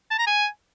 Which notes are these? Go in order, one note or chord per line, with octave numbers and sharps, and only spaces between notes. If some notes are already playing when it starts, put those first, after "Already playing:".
A5
A#5
G#5